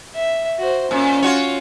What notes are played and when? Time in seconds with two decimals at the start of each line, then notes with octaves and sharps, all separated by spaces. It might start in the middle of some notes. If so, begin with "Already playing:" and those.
0.16 E5
0.59 F#4 C5
0.91 A#2 C#4
1.22 F4 F#4 C#5